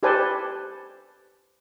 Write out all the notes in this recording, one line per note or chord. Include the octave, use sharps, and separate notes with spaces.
G4 A4 B4 C5 D5 G#5